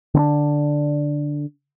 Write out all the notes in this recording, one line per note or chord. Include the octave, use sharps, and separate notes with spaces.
D3 C4 D4